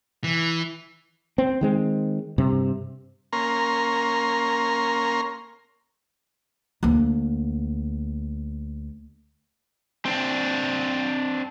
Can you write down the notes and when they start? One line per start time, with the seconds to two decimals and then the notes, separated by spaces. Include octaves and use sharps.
0.24 E3
1.38 C4
1.61 D#3 G#3 C4
2.38 G2 C3
3.33 A#3 C#4 A#4 C6
6.83 D2 A#3
10.05 C4 D4